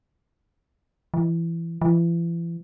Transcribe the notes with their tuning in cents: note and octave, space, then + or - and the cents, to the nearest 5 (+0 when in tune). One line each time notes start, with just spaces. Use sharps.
E3 +20
E3 +40